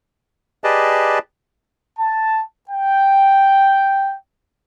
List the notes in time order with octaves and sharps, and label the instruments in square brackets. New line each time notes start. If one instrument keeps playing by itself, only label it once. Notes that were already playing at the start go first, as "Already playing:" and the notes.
[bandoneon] G4 G#4 B4 D5 D#5 A5
[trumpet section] A5
G5